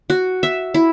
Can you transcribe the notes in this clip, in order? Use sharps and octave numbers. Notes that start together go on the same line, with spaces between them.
F#4
E5
E4